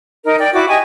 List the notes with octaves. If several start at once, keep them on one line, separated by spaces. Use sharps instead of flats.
D#4 A#4 D#5
D5 G5
E4 F#4 D5 D6
G4 D#5 G#5 C#6